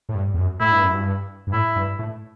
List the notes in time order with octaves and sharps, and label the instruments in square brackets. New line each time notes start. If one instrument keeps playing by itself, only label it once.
[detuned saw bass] A2
G2
E2
F#2
[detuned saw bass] A2 [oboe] E4
[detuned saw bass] G2
F#2
G2
G2
[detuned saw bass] A2 [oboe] E4
[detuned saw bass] G2
A2